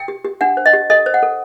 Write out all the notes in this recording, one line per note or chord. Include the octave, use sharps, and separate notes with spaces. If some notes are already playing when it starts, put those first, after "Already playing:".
Already playing: G5
G4
G4
D4 F#5
C5
D#5
G4
A4 D#5
C5
F#5
A4